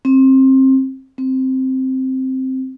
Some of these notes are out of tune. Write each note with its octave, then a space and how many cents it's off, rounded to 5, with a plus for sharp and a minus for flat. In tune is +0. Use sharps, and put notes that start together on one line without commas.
C4 +25
C4 +0